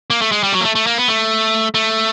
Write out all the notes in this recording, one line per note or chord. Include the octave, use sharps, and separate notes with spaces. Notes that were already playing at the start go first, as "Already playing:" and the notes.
A#3
A3
G#3
G3
F#3
A#3
A3
A3
A#3
B3
A3
A3